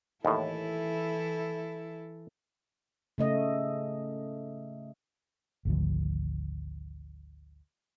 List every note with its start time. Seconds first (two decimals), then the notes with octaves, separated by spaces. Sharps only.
0.25 D#2 A2 E3 E4 A4
3.18 C#3 A3 D#5
5.65 G#1 D2 F3